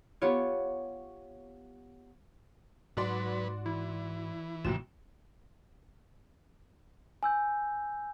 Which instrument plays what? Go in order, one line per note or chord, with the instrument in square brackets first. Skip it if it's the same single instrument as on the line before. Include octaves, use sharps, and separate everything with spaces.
[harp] B3 F4 G4 C#5
[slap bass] G#2 [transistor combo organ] F#3 B4 [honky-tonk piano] F#4 D5 C6
[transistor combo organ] E3 [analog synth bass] E4
[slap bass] A1 G#2 C3 [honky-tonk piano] D#2 F#3 E7 [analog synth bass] F4
[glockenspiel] G#5 E6 G6